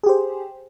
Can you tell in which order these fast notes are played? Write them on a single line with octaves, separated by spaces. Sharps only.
G#4 G4 C5